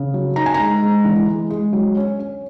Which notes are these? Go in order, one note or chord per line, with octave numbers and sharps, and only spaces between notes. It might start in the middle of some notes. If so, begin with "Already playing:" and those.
Already playing: C#3
F#3
D#4 A#5
G#5
A#5
G#3
G#3
E3
G#3
G#3
F#3
C#4
C#4